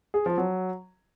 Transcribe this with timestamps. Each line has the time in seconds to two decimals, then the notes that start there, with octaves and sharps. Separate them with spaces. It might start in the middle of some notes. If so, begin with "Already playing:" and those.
0.14 G#4
0.26 F3
0.38 F#3